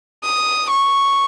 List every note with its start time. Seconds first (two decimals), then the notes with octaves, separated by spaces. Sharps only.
0.24 D#6
0.71 C#6